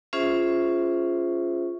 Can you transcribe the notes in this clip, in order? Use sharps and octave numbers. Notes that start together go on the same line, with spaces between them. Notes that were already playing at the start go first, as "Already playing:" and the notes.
C#4 F4 G#4 C5 E5